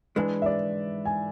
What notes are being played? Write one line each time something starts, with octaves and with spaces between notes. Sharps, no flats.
G#2 E3 G#3 D4 B4
E5
D5
G#5